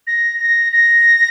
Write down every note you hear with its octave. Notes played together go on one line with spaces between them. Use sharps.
A#6
A#6
A#6